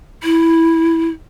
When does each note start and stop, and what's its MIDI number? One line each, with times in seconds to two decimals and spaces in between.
0.23 1.08 64